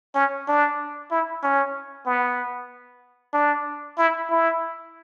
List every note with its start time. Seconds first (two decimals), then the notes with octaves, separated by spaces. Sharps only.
0.15 C#4
0.48 D4
1.11 E4
1.43 C#4
2.06 B3
3.33 D4
3.98 E4
4.30 E4